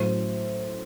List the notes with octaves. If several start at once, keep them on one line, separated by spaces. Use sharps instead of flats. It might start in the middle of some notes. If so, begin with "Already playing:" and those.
Already playing: A2 F#3 C5